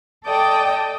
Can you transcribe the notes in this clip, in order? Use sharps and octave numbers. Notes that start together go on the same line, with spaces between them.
A4 D5 D#5 G5 A5